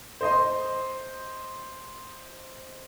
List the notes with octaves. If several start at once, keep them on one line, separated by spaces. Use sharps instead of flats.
C5 D#5 C6